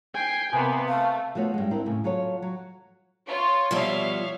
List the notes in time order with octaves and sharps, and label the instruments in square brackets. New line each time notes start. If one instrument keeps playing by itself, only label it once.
[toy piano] C5 [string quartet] G5 [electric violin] G#5 C7
[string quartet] C3 A#3 B3 [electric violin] B4 [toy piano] G#5 D#6
[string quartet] A3 [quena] F5
[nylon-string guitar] F3 A3 B3 F#4 C#5
G2 G#3
C4 D4 E4 A#4
A2 C#3
F#3 F4 A4 C#5
F#3
[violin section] F4 C#5
[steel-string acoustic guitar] B2 F3 G3 [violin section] C#5 E5 F5